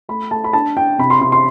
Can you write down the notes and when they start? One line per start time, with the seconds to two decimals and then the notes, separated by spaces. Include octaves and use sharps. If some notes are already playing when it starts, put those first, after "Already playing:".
0.09 A3 B5
0.31 A3 A5
0.44 B5
0.53 D4 A5
0.77 D4 G5
0.98 C3 B5
1.10 C6
1.21 C3 C6
1.32 C6